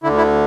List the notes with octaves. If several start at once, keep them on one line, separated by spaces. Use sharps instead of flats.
D2 D3 E4
E4